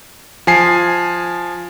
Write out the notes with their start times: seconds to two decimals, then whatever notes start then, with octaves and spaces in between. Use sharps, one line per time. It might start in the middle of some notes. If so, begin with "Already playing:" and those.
0.47 F3 G#5 C7